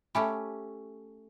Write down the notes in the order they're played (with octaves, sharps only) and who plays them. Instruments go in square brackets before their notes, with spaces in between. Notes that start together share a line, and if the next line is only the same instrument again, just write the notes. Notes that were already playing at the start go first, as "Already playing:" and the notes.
[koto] A3 C#4 G4 [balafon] E5 G#5 B5